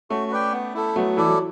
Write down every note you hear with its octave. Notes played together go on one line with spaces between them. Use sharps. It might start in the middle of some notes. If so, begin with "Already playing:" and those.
A3 C#4 F#4
B4 D5 G5
B3
E4 A4
F#3 A3 B3
E3 E4 A4 D5
F#3